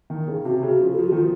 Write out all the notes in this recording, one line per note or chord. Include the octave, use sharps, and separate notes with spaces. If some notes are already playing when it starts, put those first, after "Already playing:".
D#3
C#3
C3 F#4
C#3
F#4
F3
A4
F3 F#4
D#3
F3 F4